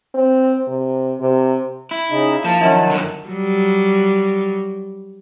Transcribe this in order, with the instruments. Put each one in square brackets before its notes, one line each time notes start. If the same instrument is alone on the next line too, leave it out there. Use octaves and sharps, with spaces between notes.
[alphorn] C4
C3
C3
[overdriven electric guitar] E4
[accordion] C#3 D#4
[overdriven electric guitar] F3 [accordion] A#3 [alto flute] A5
[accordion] D#3 F#3 [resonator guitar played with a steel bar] C#4 E4
[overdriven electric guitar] F#2 D3
[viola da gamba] F#3 G3